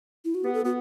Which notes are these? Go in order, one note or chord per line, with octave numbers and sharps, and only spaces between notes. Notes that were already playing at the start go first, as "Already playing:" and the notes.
E4
F#4
B3 G4
A4
B3 F#4